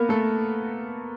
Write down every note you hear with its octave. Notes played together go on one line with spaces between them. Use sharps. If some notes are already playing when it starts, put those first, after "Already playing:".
Already playing: A#3 B3 A#4 B4
A3 A4